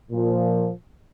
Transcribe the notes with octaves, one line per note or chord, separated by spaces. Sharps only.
A#2 F3